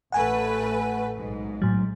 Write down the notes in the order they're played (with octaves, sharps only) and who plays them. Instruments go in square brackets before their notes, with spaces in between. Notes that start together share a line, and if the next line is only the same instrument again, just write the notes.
[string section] A1 A3 B4 [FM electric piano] F#5 G#5
[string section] B1 G#2
[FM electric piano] A2 F#3